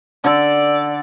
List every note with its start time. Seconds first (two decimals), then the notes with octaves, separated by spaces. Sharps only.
0.24 D3 A4 D5